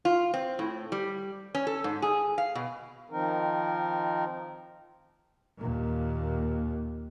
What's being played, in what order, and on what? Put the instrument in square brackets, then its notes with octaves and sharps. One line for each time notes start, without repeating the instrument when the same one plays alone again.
[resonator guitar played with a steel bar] F4
C4
A2
G3
C#4
A4
G#2
G#4
F5
B2
[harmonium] D#3 F3 C4 D#4 A#4
[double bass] D#2 A#2